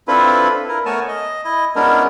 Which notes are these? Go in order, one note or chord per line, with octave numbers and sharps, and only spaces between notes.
C4 D4 E4 F4 A4 B4
E4 A#4
A3 B3 A#4 C#5 G#5 A5
D#5
E4 D#5
G#3 B3 C#4 D4 E4 A#4